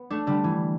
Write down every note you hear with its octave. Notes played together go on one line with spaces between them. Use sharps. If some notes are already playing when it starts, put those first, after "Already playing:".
Already playing: B3
A3 D4
D3 G3
E3